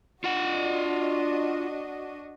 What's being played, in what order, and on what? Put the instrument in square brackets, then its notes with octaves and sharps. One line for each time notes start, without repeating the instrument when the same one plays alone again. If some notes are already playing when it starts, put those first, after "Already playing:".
[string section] D4 F#4 D#5 [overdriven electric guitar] F4 F#5